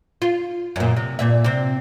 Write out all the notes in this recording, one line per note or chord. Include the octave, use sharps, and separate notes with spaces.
F4
F#2 A#2
C3
G2 A#2 E5
C3 C4